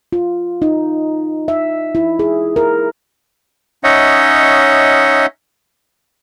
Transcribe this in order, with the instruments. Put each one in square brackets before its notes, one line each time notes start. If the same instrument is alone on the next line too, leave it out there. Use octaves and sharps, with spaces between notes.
[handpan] F4
D#4
E5
E4
G#4
A#4
[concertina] C#4 D#4 C#5 D#5 E5 F#5